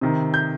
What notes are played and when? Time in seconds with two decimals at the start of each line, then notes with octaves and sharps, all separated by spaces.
0.01 C3 D#3
0.34 G6